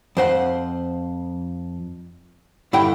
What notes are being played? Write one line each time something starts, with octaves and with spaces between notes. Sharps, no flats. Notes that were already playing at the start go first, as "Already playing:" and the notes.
F2 C5 F#5
G2 D3 E4 F#5 G5